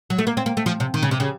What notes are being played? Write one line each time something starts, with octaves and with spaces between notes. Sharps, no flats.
F#3
A3
A#3
C4
A#3
A3
F3
C3
D#3
C#3
C3
C#3